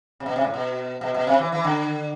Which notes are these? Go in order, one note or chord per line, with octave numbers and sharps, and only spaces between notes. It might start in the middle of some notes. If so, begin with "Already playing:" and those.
C3
B2
C3
A2
B2
B2
B2
C3
E3
E3
D3